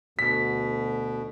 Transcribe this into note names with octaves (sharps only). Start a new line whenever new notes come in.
D2 B2 B6